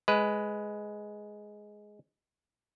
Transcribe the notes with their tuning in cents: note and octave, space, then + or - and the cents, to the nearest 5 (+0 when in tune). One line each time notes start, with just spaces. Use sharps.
G#3 +10 B4 +10